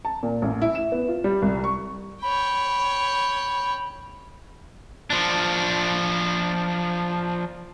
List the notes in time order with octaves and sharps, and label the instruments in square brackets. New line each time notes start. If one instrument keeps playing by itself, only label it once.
[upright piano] A5
A#2
A1
E4
E7
B3
F4
G3
C2
C#6
[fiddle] C#5 G5 [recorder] B5
[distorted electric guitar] F3 D4